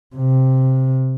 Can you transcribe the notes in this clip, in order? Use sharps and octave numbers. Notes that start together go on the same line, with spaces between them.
C3